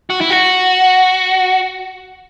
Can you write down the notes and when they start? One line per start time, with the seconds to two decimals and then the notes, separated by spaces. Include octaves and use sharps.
0.10 F#4
0.21 E4
0.30 F#4